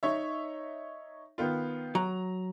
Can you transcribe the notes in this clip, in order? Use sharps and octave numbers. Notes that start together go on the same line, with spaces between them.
D#4 C#5 E5
D#3 B3 F4
F#3 A#5